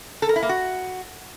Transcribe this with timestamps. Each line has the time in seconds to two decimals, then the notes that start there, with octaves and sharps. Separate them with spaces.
0.22 A4
0.29 A#4
0.36 E4
0.42 A#3
0.49 F#4